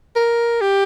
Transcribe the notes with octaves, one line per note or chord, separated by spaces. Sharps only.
A#4
G4